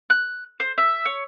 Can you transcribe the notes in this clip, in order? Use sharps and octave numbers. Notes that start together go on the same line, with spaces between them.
F#6
C5
E5
C#5